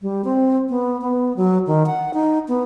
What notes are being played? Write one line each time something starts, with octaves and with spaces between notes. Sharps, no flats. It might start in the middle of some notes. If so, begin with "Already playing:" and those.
G3
C4
B3
B3
F#3
D#3
F#5
D#4
B3